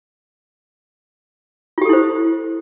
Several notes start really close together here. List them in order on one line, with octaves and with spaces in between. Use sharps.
F4 G4 A4 E4 C5